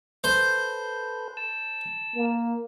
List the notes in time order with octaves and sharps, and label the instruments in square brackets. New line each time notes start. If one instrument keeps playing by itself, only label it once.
[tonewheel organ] A4 B4 [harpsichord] C5
[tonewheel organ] A5 E6
[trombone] A#3